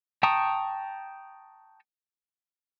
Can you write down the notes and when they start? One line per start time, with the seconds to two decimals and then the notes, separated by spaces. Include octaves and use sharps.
0.23 G5 A5 A#5 C#6 D#6